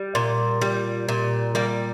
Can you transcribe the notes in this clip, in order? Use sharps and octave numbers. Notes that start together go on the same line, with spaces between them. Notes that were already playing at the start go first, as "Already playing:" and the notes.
Already playing: G3
A#2
G3
A#2
G3 A#3